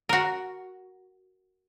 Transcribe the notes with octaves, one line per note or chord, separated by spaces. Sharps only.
F#4 A#4